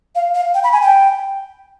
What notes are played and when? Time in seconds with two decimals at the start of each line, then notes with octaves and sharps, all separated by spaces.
0.15 F5
0.35 F5
0.54 G5
0.64 B5
0.73 G#5
0.82 G5